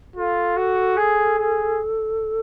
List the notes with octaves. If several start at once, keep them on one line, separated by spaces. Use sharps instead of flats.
F4 A4
F#4
G#4
G#4